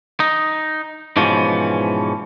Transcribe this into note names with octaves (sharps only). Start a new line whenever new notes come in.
D#4
G#2 B2 E3 F3 C#4